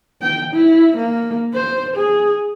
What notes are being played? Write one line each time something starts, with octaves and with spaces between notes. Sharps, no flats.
G5
E4
A#3
C5
G#4